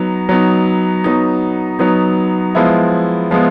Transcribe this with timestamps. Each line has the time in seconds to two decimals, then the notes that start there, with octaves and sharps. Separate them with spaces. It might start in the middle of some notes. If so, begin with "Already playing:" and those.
Already playing: F#3 B3 D#4
0.29 F#3 B3 D#4
1.04 F#3 B3 D#4
1.79 F#3 B3 D#4
2.55 F3 G#3 B3 E4
3.31 F3 G#3 B3